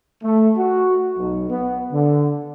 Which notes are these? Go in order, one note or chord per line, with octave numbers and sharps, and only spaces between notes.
A3
F#4
B1
B3
D3